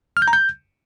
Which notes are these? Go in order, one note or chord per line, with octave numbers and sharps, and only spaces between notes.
F6
G6
A#5
G6